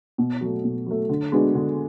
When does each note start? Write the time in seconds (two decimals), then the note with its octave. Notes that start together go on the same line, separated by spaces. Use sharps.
0.18 B2
0.41 F#3 A3
0.64 B2
0.86 F#3 A3
1.09 D3
1.32 G#3 B3 D4 F#4
1.55 D3